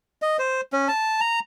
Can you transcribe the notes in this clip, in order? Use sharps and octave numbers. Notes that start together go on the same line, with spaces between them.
D#5
C5
C#4
A5
A#5